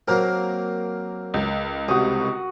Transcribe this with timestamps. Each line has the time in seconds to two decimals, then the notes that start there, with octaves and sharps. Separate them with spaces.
0.08 F#3 A#3 C4 A#4
1.34 C#2
1.88 C2 F#4 D#6